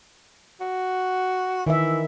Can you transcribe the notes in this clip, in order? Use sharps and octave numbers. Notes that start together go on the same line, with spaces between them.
F#4
D#3 E3 E5